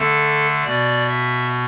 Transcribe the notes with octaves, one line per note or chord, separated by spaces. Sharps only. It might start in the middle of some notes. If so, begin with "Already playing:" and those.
Already playing: D3 A3 A4
B2 B3 D5
E5